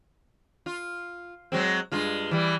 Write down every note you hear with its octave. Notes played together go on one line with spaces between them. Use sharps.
F4
F#3 G#3 C4
G2 G#3 F4
E3 G3